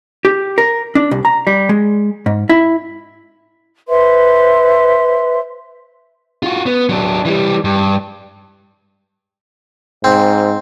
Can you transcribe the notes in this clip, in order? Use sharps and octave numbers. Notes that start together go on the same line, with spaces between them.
G4
A#4
D4
C2
A#5
G3
G#3
G#2
E4
B4 C5 E5 C6
F4 F#4
B3
F#3 D4
E3 G3
G2
G#2 C4